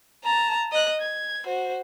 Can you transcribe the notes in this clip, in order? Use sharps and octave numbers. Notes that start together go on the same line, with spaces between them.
A5 A#5
D#5 F#6
G#6
F#4 C5